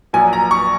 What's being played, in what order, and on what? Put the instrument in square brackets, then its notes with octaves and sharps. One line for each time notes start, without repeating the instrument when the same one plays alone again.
[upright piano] A#1 A#2 F#3 G#5
A#5
C#6